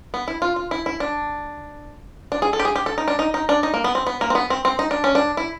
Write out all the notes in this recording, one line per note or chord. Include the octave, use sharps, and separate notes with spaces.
B3
E4
F4
F4
E4
E4
D4
D4
G#4
A4
G4
G#4
G4
A4
D#4
D4
D#4
D#4
D4
D#4
A#3
B3
C4
B3
A#3
C4
B3
C4
C4
D#4
D4
C#4
D4
E4